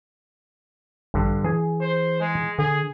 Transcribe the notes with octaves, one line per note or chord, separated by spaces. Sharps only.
A1 G2 D3
E3 G#4 G#5
C5
G#3
D3 G#4